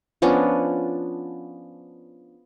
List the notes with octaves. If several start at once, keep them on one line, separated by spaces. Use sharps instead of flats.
F3 B3 C#4 D4